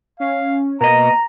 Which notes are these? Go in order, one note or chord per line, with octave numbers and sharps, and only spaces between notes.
C#4 F5
B2 A#3 D#5 A#5